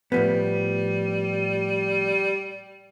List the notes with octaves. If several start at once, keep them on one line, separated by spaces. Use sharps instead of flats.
A2 F3 G3 B3